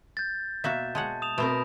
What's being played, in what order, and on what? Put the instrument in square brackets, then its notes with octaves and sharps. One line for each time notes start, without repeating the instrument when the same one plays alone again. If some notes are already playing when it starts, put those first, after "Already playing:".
[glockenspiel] G6 A6
[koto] B2 A#3 F#4 [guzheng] E5
[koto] G#3 C#5 F#5 [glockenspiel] A5
[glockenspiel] D#6 E7 F7
[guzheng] B2 A#4 [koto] A3 C4